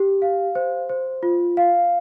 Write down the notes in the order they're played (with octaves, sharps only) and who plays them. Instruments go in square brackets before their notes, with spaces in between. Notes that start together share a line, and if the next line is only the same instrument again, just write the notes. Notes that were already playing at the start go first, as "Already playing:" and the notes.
Already playing: [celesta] G4
F5
C5
C5
F4
F5